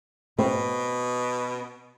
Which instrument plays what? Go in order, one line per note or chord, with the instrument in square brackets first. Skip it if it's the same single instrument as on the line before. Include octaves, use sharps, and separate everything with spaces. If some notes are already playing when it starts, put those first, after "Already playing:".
[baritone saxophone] B2 [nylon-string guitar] C4